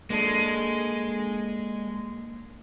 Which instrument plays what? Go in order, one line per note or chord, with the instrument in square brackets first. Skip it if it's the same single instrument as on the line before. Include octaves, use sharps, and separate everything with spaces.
[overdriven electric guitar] G#3 [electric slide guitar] A#3 D4 A4